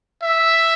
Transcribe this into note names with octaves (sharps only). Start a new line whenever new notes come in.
E5